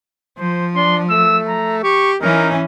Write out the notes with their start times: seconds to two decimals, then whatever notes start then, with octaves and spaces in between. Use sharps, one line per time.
0.39 F3 C5
0.76 D4 C6
1.10 A3 E6
1.49 A#5
1.83 G4 C#6
2.22 E3 C#4 D#4 A#4